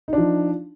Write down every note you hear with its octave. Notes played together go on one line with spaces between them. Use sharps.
F3 D4 D#4